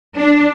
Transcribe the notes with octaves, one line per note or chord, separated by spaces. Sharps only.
D4